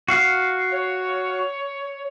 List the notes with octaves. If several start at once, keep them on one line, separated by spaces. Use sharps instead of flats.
F#4 F5
C#5